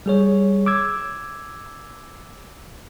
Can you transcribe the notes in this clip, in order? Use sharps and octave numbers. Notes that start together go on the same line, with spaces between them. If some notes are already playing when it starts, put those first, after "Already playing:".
G3 G#4 C#5
D6 E6 G#6